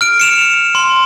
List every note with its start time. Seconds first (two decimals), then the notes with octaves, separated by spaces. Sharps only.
0.01 F6 D7
0.20 C#7 E7 F7
0.75 C6